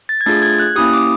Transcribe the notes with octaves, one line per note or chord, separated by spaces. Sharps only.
A6
G#6
A3 D4 F4 G#4 A6
G#6
F#6
A#3 C#4 E4 G4 D#6
D6